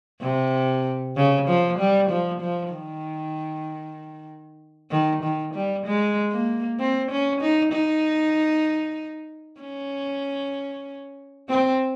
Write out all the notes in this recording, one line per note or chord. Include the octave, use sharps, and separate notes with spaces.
C3
C#3
F3
G3
F3
F3
D#3
D#3
D#3
G3
G#3
A#3
C4
C#4
D#4
D#4
C#4
C4